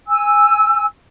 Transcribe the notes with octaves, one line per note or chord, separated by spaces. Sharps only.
G#5 E6